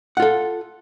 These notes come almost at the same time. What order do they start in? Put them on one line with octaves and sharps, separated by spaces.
F#5 F4 A4